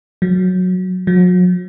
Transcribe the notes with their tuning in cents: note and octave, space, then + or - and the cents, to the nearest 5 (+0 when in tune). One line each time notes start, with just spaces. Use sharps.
F#3 -15
F#3 -40